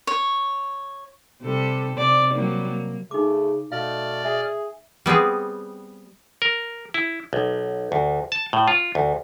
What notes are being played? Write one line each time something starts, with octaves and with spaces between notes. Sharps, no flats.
C#5
C3 G3 A4
C3 D5
F#3 G3 A#3
A#3
C#3 A3 D#4 D6
B2 A3 D5 F5 F6
G#4 E5
G3 B3 C4 G#4
A#4
E4
B1
D2
A5
A2
F4
D2